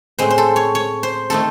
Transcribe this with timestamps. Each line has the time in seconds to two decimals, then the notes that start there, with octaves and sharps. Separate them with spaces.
0.19 A2 G#3 C4 C5
0.30 C5
0.38 A4
0.56 C#5
0.75 C#5
1.03 C5
1.30 D#3 A3 C4 D#4 A4